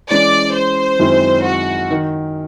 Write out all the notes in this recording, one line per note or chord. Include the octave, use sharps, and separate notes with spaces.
E3 G#3 C#4 D5
C5
F#2 D#3 G#3 C4 E4
F#4
D#3